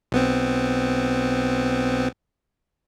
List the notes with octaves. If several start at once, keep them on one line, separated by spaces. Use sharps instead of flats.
B1 B3 C4